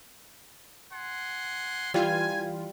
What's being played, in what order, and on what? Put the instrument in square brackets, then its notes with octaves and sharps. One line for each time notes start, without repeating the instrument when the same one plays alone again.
[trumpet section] F#5 G#5 C6
[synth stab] E3 F4 [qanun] G3 [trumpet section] G#5